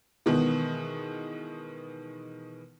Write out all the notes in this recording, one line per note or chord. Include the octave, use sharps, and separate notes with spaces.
B2 D#3 E3 G#3 B3